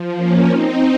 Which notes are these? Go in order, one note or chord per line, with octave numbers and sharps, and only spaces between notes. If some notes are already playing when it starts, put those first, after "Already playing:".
Already playing: F3
A#3 C#4
C4 D#4